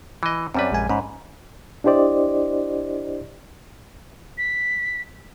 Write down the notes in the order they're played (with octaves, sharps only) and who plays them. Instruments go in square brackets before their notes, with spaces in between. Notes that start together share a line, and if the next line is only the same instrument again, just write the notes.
[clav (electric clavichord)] E3 D#5
[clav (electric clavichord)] F#2 G3 B4 [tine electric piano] C4 C#4 D5
[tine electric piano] A#1 G#3 G#5
[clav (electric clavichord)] G#2 [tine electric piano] C#4 B5
[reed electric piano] D4 E4 G4 C5 D5 D#5
[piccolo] B6